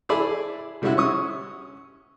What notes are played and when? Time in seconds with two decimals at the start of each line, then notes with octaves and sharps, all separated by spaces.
0.09 E4 G#4 A4 D5 B5
0.82 D3 G3 G#3 C#4 E4 F#4
0.97 C#4 C#6 D#6